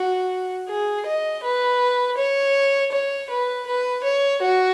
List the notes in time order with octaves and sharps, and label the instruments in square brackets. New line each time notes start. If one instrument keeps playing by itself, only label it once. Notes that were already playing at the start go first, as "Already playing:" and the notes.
Already playing: [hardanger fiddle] F#4
G#4
D#5
B4
C#5
C#5
B4
B4
C#5
F#4